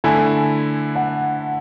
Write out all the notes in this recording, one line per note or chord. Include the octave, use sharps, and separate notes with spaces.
D3 A3 E4 G#5
F#5